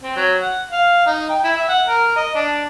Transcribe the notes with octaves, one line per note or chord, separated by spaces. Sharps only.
C4
F#3
F#5
F5
D#4
G5
E4
E5
F#5
A#4
D#5
D4